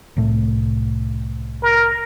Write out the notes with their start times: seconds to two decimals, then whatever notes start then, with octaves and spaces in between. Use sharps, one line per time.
0.17 C2 A2 A3
1.62 A#4